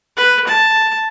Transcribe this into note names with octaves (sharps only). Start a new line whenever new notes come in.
B4
A5